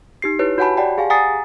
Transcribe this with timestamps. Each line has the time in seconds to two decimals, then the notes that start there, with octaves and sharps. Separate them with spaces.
0.22 D#4 G4 C7
0.39 E4 G4 B4 C#5
0.58 F#4 C#5 F#5 G#5 A5 B5
0.77 G4 D5 F#5 G5 A5
0.98 G4 G#4 F5 G#5
1.10 F#5 G#5 A#5 D#6 A6 C7